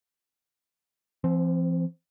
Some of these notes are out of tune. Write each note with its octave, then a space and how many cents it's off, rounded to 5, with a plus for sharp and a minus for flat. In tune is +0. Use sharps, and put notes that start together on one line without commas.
F3 -45 C4 +0